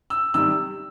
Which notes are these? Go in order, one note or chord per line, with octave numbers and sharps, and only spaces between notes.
E6
C3 D#3 G3 E6